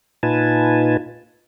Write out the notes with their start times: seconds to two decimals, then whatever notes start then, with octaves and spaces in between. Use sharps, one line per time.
0.23 A#2 D#4 F4 B4 G#5 A5